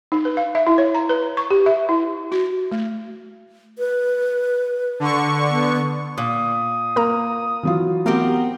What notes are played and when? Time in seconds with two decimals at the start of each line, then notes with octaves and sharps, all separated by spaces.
0.12 D#4
0.25 B4
0.37 F5
0.55 E5
0.67 E4
0.78 C#5
0.95 A#5
1.09 B4
1.37 C#6
1.50 G4
1.66 E5
1.89 E4
2.32 F#4
2.71 A3
3.78 B4
5.00 D3 C#6
5.50 B3
6.18 A#2 D#6
6.96 A#3 A#4 A#5
7.63 E3 F#3 F4
8.06 A3 B3 C4 G4 A#4